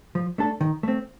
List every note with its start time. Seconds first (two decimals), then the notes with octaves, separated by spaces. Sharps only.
0.15 F3
0.38 A3 D4 A4
0.61 D#3
0.83 A3 C4